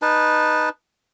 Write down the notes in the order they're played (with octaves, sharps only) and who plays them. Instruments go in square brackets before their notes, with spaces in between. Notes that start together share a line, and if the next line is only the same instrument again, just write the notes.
[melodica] D#4 B4 A5